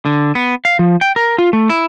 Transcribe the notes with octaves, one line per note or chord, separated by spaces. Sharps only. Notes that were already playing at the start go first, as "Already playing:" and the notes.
D3
B3
F5
F3
G5
A#4
F4
A3
E4